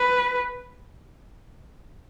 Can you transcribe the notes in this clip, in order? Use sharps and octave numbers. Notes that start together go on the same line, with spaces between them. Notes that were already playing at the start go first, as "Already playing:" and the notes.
Already playing: B4